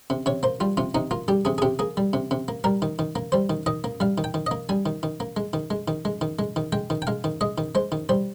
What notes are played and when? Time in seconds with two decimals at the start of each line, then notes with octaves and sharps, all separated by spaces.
0.10 C3
0.26 C3 C#5
0.43 A#3 C5
0.60 G3 F4
0.77 C3 F4
0.95 C3 D#4
1.11 A#3 F4
1.28 G3 G4
1.45 C3 G#4
1.58 G#4
1.62 C3 G4
1.79 A#3 G#4
1.97 G3
2.13 C3
2.31 C3
2.48 A#3
2.64 G3 A#4
2.82 D#3
2.99 D#3
3.16 A#3
3.32 G3 C5
3.50 D#3
3.66 D#3 D#5
3.84 A#3
4.00 G3 F5
4.18 D#3
4.24 G5
4.34 D#3
4.47 A#3 D#5
4.69 G3 G#5
4.86 D#3
5.03 D#3
5.20 A#3
5.37 G#3
5.53 D#3
5.70 G#3
5.88 D#3
6.05 G#3
6.21 D#3
6.39 G#3
6.56 D#3
6.72 G#3 G5
6.90 D#3
7.02 G5
7.07 G#3 F5
7.24 D#3
7.41 G#3 D#5
7.58 D#3
7.75 G#3 C5
7.92 D#3
8.09 G3 C5